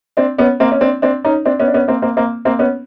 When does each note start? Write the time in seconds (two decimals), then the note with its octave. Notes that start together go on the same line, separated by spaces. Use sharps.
0.17 C4 D4
0.38 B3 C#4
0.60 A#3 C4
0.72 C#4
0.81 C4 D4
1.02 C4 D4
1.25 C#4 D#4
1.45 C4 D4
1.60 B3 C#4
1.67 D4
1.74 B3 C#4
1.88 A#3 C4
2.02 A#3 C4
2.17 A#3 C4
2.45 A#3 C4
2.59 B3 C#4